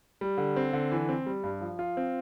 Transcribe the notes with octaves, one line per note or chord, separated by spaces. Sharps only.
G3
D3
C4
D3
E3
C4
G3
G2
F3
F4
C4